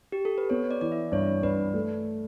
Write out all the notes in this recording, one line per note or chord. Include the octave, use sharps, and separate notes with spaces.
G4
A4
B4
B3 C#5
D5
E3 D5
E5
G2 C#5
G2 B4
A3